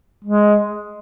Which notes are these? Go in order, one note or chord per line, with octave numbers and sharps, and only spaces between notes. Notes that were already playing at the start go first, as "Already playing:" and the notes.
G#3